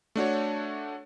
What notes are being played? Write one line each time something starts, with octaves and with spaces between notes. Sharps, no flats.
A3 D4 F#4 C#5